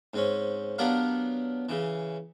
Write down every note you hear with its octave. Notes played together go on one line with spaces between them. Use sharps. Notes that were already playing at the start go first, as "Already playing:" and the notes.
G#2 C4 C#4
F#3 B3 D4 G4 A#4 F5
C#3 E3